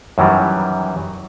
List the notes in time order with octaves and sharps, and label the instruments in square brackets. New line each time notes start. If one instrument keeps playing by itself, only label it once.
[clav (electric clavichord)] F#2 D#3 E3 F#3 G3